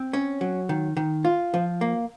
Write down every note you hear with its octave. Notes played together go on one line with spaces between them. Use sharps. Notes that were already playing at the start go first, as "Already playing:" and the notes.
Already playing: C4
C#4
F#3
D#3
D#3
F4
F3
A#3